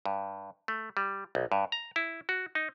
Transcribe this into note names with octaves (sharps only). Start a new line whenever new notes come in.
G2
A3
G3
B1
G2
A#5
E4
F#4
D#4